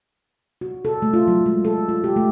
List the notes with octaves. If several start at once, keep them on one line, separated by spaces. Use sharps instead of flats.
F#4
A4
A3
F4
F#3
G#3
A4
F4
G4
A3